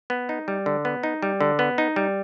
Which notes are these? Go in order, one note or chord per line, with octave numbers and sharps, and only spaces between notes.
B3
D#4
G3
D3
B3
D#4
G3
D3
B3
D#4
G3